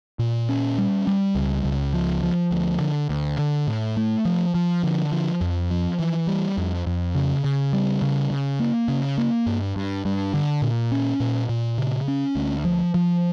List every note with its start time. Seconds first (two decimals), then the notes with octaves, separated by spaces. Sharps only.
0.19 A#2
0.49 C#4
0.78 G3
1.07 G3
1.35 C#2
1.64 C#2
1.93 F3
2.23 F3
2.51 D2
2.80 D3
3.09 D2
3.38 D3
3.67 A2
3.97 A3
4.25 F3
4.55 F3
4.83 D3
5.12 F3
5.41 F2
5.71 F3
5.99 E3
6.27 G3
6.58 F2
6.86 F2
7.15 C#3
7.44 C#3
7.73 G3
8.02 C#3
8.31 C#3
8.60 A#3
8.88 C#3
9.18 A#3
9.46 G2
9.76 G2
10.05 G2
10.34 D3
10.62 A#2
10.92 C#4
11.20 A#2
11.49 A#2
11.78 C#3
12.08 C#4
12.36 D2
12.65 F3
12.94 F3